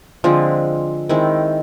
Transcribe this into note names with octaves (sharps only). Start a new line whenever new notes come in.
D3 F3 G#3 C4
D#3 G#3 C4 E4